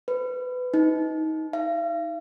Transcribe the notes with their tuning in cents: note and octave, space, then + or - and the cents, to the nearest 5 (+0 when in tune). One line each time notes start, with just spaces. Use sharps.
B4 +20
D#4 +25
F5 -40